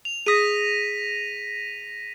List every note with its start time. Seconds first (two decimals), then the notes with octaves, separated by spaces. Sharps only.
0.05 F7
0.26 G#4 D#6 A#6 B6 D#7